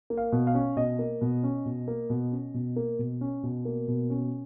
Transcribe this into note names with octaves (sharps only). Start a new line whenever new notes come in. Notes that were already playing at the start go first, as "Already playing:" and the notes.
A#3
F5
B2
F5
C#4
B2 D#5
A#3
B2
C#4
B2
A#3
B2
C#4
B2
A#3
B2
C#4
B2
A#3
B2
C#4